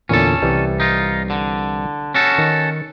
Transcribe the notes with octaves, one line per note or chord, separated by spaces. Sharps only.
E2 A#2 D3 C#4 A4
C2 E3 G3
D#4 F4
D3
C#4 F#4 A4
D#3